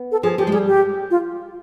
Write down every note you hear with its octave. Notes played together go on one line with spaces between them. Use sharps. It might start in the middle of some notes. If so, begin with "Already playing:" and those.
Already playing: B3
A4
F3 G#4
F3 G4
G#3
G3 G#4
G4
F4